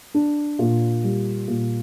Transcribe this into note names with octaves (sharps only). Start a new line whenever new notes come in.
D4
A#2
G3
A#2